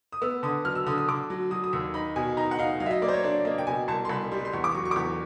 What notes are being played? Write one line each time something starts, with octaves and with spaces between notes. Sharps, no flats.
D#6
B3 E6
D3 D#6
F#3 F6
E6
D3 D#6
D#6
D3 D6
F#3
F#3 D#6
D#6
D#2 E6
D#4 B5
B2 G#5
D#4 A#5
F#5
D#4 F5
F#3 F5
E5
D#5
A#3 D5
C5
C#5
D4 D5
A#3 D#5
G5
B2 G#5
C2 A5
C6
C2 B5
G3 C6
C6
E2 C#6
D6
F#3 C#6
C#6
D6
E2 C#6